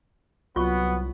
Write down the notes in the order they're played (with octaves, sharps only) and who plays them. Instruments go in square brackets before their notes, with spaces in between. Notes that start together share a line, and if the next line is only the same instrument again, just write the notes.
[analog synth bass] C2 [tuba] F#3 [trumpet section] B3 [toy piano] F4 C#6